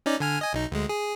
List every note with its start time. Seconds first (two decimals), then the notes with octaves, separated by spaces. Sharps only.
0.06 C#4 D#4 D5
0.20 D3 G#5 F6
0.41 D#5 G#5
0.53 B1 D#4
0.72 D2 G#3
0.89 G#4